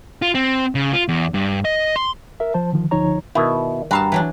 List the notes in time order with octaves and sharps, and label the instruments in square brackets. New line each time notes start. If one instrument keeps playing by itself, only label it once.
[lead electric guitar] F4
C4
C#3
F4
E2
G2
D#5
C6
[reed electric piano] A#4 E5
F3 C5 A5
D3 D#3 F3
C#2 D3 F3 D#4 C#5 A#5
[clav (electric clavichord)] B2 E4 [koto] D#3
[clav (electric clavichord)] G2 A#5 [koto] F#4 F5 A5
[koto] E3 F#3 D4